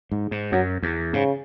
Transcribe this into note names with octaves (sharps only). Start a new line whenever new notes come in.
G#2
G#2
F#2 F#3
E2
G#2 C#3